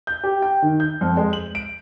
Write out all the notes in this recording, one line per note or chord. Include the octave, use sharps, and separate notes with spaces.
G6
G4
G5
D#3
G6
F2
G#3
F#7
D7